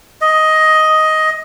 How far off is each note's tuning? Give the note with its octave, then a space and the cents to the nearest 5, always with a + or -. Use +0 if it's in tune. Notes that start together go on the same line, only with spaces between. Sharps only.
D#5 +10